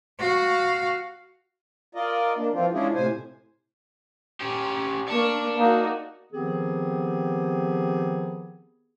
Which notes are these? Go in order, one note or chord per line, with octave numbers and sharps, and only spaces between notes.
F#4 F5
F4 A#4 D5 D#5
A#3 D4
E3 F3 C4 F4
G#3 C#4 D4 E4 F4 G#4
A2 C3 C5 G#5
C#4 G4
A#3 D5 A5 C#6
A#3 D#4 F#4
D#3 F3 B3 C4 G4 G#4